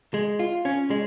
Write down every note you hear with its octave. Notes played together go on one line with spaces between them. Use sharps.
G#3
F4
C#4
G#3